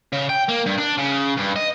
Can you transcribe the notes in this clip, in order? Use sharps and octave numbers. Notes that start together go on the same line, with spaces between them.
C#3
G5
A#3
G2
D4
C#3
G2
D#5